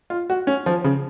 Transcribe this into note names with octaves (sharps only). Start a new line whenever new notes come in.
F4
F#4
C#4
F3
C#3